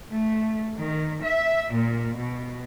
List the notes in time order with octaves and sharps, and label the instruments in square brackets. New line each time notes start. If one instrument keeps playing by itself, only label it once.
[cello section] A3
D#3
E5
A#2
B2